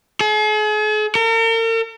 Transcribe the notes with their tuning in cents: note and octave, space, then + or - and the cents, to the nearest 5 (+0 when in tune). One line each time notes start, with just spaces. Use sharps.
G#4 +45
A#4 -45